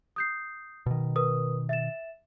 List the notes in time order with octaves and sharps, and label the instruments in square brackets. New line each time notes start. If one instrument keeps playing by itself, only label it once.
[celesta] D#6 G6 C7
[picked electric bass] B2 D#3
[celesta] A#4 B4 D#6
E5 A6 E7